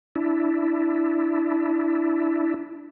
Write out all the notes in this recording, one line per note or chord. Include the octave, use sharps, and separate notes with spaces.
D4 E4